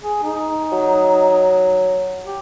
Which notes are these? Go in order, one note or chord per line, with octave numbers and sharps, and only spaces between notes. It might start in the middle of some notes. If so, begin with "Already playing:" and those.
G#4
D#4
F#3
G4